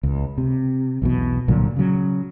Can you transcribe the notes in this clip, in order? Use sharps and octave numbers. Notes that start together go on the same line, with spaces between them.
C#2
C3
B1 E2 B2
C2 A#2 D3 F#3
C#3 F#3